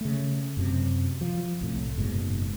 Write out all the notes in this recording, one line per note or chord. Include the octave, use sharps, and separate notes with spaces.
C#3 A3
F#2 C3
F3
C2 A2
F#1 G#2 B2